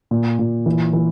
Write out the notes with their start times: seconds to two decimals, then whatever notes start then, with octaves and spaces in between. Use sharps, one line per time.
0.11 A#2
0.39 A#2
0.66 E3
0.93 E3